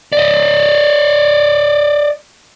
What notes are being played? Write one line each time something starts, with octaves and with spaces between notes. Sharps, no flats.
D5 D#5